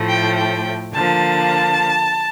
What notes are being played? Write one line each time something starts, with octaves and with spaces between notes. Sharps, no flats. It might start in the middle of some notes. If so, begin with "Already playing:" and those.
Already playing: A2 F3 A3
G5
G5
D3 F3 A#3 A5